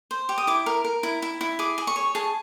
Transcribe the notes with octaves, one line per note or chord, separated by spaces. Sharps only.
C5
G4
D#6
E4 D6
A#4
A#4
E4
E4
E4
G#4 D6
G#4
C#6
C#5
G#4 A5